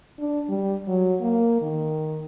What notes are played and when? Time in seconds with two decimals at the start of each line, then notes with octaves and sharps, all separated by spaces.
0.19 D4
0.49 G3
0.88 F#3
1.21 A#3
1.62 D#3